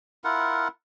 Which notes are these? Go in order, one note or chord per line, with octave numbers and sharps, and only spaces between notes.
E4 F4 A#4 F#5